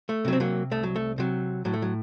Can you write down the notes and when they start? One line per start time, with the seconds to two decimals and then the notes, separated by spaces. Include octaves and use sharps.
0.09 A3
0.25 C3 F#3
0.33 C4
0.40 F#3 A#3
0.71 C2 A3
0.83 F#3
0.96 A3
1.18 C3 F#3
1.65 A2 F#3
1.73 A3
1.82 F#3